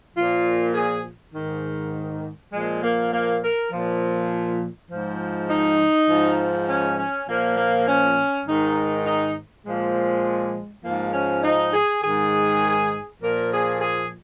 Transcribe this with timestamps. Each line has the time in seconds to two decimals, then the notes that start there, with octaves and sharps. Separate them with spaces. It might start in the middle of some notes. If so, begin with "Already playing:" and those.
0.16 A#2 F3 F4
0.74 G#4
1.34 G#2 D#3
2.53 A#2 F3 G#3
2.82 A#3
3.12 A#3
3.43 A#4
3.72 A#2 F3
4.91 G#2 F3
5.49 D#4
6.09 G#2 F3
6.68 C#4
6.98 C#4
7.28 A#2 F3 A#3
7.57 A#3
7.87 C#4
8.46 G#2 D#3 D#4
9.06 D#4
9.65 A#2 F3 G#3
10.84 G#2 F3 A#3
11.14 C#4
11.43 D#4
11.73 G#4
12.03 G#2 D#3 G#4
13.22 A#2 F3 A#4
13.52 G#4
13.80 G#4